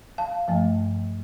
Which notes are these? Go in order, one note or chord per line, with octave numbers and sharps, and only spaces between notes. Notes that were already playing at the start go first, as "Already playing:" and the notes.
F5 A5
G2 F3 A3